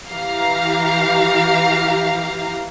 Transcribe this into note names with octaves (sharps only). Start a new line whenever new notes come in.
E3 G4 F5 A#5